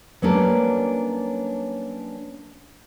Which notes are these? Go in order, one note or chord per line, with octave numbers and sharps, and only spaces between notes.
F#3 G3 A#3 B3 C#4 D4